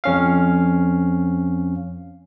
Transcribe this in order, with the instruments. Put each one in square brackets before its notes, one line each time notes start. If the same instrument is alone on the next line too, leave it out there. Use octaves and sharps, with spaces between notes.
[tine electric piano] F2 C#4 F5